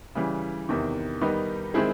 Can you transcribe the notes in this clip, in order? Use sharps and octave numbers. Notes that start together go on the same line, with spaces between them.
C#3 E3 G3
E2 C3 D#3
D#3 G3 B3 D#4
D#3 G#3 C4 E4 G#4